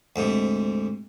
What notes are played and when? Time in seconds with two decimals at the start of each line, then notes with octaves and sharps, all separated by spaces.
0.16 D2 G#2 C3